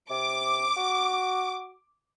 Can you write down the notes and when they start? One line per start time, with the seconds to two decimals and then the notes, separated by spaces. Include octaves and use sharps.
0.11 C3 D6
0.77 F#4